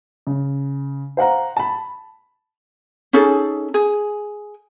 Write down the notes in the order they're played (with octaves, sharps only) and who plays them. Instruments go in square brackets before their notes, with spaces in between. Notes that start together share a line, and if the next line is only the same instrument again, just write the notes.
[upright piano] C#3
C5 F5 F#5 A#5
A5 B5
[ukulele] C#4 D#4 G#4 A4
G#4